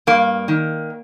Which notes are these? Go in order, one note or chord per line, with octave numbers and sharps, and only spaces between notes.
G2 A#3
D#3